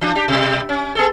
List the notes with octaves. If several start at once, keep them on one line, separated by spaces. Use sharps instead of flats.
E3 D4
D4 G4
B2 G3
C#4
B3 G#4 A4